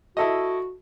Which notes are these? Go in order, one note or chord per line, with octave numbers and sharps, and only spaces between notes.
E4 F#4 A4 D#5